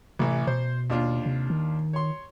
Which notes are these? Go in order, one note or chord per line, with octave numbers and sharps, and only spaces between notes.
A1 C3 E3
B2 C5
D#2 D4 F4
C3
D#3
C#5 C6